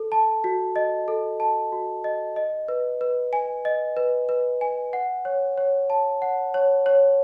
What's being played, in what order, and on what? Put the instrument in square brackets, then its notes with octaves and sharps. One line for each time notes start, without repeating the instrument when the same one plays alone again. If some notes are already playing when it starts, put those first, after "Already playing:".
Already playing: [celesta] A4
A5
F#4
D#5
A4
A5
F#4
D#5
D#5
B4
B4
G#5
D#5
B4
B4
G#5
F#5
C#5
C#5
A5
F#5
C#5
C#5